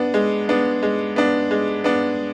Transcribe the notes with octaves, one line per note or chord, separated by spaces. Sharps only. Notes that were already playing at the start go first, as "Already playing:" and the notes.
Already playing: B3 D4
G#3
B3 D4
G#3
B3 D4
G#3
B3 D4